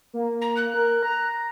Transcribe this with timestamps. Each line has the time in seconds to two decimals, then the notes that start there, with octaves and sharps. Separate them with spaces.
0.13 A#3
0.42 A#5
0.57 F#6
0.74 A#4
1.03 A#5